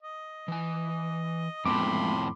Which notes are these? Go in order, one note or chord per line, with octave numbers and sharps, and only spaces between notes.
D#5
E3 G#5
F2 A2 G#3 B3 B5 C6 D6